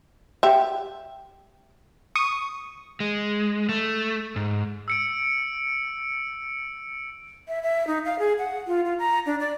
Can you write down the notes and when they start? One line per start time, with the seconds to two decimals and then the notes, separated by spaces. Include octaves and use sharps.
0.43 G4 E5
2.16 C#6 D#6
3.00 G#3
3.69 A3
4.36 G#2
4.88 E6 C#7 D7
7.48 E5
7.63 E5
7.87 D#4
8.05 F5
8.19 G#4
8.39 F#5
8.67 F4
8.85 F4
8.99 A#5
9.26 D4
9.40 D5